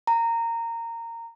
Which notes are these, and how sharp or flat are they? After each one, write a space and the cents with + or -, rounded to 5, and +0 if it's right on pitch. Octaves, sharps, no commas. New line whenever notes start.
A#5 -15